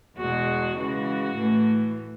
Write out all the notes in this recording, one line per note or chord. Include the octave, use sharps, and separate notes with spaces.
E2 B2 G#3 F#4
C#3 E3 G#3 F#4
A2 E3 A3